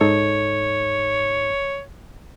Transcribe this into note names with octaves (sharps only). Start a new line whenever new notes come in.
G#2 D#4 A4 C#5